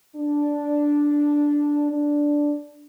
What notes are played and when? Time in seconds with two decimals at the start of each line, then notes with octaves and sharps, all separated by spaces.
0.16 D4
1.91 D4